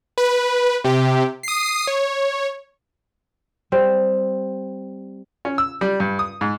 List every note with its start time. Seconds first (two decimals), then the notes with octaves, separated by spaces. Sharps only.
0.18 B4
0.84 C3 G4
1.43 D#6 C7
1.87 C#5
3.72 G3 C4
5.45 C#4
5.58 E6
5.81 G3
6.00 G2
6.19 D#6
6.41 G#2